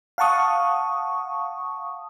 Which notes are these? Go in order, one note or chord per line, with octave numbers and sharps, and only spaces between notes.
F5 F#5 A5 C#6 D#6